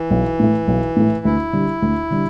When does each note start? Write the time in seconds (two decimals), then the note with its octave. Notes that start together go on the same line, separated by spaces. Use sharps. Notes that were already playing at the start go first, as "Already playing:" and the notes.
Already playing: E3
0.11 B1
0.39 A2 A3
0.68 B1
0.96 A2 A3
1.25 D2 E4
1.53 D3 G3
1.82 D2
2.10 D3 G3